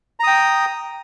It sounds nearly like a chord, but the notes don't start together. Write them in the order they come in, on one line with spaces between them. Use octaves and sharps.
A#5 D#6 G5